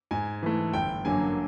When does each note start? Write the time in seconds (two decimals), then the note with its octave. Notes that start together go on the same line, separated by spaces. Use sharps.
0.11 G#2 G#5
0.43 E3 A3
0.74 G1 G5
1.05 F#2 D3 F#3 A#3 G#5